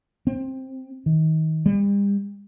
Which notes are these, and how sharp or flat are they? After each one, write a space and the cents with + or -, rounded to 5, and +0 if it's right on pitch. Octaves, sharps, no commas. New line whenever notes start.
C4 +10
D#3 +25
G3 +40